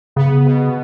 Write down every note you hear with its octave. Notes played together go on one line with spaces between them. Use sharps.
C#3 B3
B2